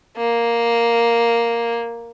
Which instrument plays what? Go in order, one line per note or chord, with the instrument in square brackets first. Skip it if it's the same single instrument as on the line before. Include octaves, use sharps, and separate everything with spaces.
[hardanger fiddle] A#3